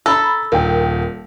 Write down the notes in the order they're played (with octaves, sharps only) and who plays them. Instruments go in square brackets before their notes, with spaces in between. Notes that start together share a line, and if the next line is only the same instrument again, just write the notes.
[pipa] A4 [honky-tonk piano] A#5 B5 A#6
[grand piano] D#1 [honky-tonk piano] A#4 G5